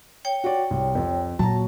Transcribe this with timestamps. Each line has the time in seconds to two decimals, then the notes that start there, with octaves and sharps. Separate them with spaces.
0.25 C#5 G5
0.44 F#4 D5
0.71 C2
0.95 F2
1.39 A#2 F#3 F#4 A5 A#5